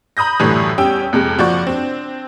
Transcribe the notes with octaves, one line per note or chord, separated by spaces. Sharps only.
A#5 B5 D#6 G6 A#6
F#2 A2 D3 E3 G3
E2 G3 C#4 G4 G5 E6
F2 C3 G#3
F#1 F3 F#4 D5 C#6
C4 D4